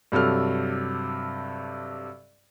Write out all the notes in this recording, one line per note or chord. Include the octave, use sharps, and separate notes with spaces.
G2 C3 F#3 A4 F6